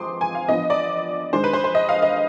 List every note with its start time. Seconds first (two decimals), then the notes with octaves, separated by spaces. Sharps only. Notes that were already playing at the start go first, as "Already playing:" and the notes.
Already playing: F3 G#3 C4 C6 D6 D#6
0.21 G#5
0.35 F5
0.48 F3 B3 D4 D#5
0.70 D5
1.33 D#3 G#3 D4 C5
1.44 B4
1.53 C5
1.64 C5
1.75 D#5
1.89 F5
2.02 D#5